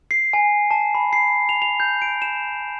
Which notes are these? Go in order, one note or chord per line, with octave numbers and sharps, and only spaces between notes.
C7
G#5
A5
B5
C7
F7
F7
G6
D7
E7